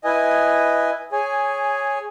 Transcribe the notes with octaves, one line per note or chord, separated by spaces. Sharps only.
E4 B4 D#5 G#5
G#4 C#5 G#5